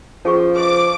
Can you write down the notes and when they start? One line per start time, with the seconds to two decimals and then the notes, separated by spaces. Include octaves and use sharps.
0.25 F3 C#4 G#4 C#6
0.55 B4 C5 D#5 D6